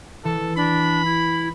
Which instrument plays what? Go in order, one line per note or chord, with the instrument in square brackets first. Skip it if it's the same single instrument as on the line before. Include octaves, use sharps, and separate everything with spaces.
[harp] E3 [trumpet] A4
[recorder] D4 [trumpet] B5
[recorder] E4